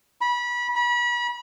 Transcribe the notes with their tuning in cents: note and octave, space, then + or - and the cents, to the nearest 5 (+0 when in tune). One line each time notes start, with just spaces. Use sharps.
B5 -25
B5 -35